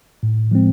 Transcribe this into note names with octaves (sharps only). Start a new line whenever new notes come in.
A2
F3 G#3 C4